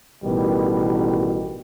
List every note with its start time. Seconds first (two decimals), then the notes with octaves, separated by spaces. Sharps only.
0.23 A1 B2 D#3 G3